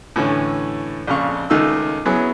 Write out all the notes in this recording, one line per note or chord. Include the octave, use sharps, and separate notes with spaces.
A2 D3 E3 C#4
A#1 F2 C#3 F5 C#6
C#2 D#3 A3 E6
F#3 B3 C#4 E4 G#4